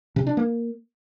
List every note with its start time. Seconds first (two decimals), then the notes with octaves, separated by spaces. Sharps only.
0.16 C3
0.27 D4
0.37 A#3